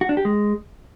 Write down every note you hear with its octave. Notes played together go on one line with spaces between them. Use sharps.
F#4
D4
G4
G#3